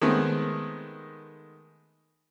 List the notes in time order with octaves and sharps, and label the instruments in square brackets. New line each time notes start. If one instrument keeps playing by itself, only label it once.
[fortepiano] D#3 G#3 A3 B3 C4